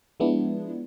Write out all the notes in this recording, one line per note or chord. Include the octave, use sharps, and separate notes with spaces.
F3 G#3 B3 D4 E4